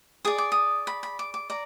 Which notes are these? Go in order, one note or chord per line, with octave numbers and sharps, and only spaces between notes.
G#4 D5 D#6
D6
D#6
B5
B5
D6
D6
D5 A#5